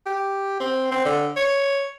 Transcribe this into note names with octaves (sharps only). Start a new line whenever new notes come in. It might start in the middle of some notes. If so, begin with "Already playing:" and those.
G4
C4
C4
D3
C#5